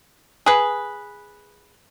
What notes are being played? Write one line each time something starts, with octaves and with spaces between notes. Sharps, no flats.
G#4 B4